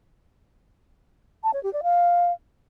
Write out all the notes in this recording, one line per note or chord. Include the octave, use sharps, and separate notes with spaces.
A5
C#5
G4
D5
F5